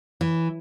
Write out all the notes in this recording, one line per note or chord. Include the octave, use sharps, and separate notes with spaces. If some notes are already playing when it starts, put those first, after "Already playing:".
E3